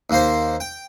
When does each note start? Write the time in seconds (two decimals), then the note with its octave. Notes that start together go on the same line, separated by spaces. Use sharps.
0.10 D#2 A#3 C5
0.60 G5